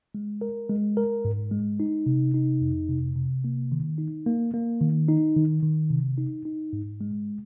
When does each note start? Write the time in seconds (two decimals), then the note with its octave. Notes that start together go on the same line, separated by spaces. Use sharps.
0.15 G#3
0.41 A#4
0.69 G#3
0.97 A#4
1.25 G#2
1.52 G#3
1.80 D#4
2.06 C3
2.34 D#4
2.61 F2
2.89 C3
3.16 C3
3.44 A#3
3.72 D#3
3.98 D#4
4.26 A#3
4.54 A#3
4.81 D#3
5.09 D#4
5.37 D#3
5.63 D#3
5.90 C3
6.18 D#4
6.45 D#4
6.73 G#2
7.01 G#3